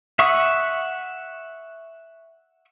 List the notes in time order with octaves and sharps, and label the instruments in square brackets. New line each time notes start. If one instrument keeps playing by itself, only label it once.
[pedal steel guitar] E5 F#5 C#6 D#6